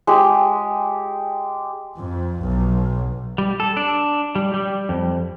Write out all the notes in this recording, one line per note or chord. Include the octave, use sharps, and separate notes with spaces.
G#3 G4
F2
B1
G3
A4
D4
G3
G3
F2